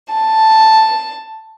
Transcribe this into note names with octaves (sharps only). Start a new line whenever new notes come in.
A5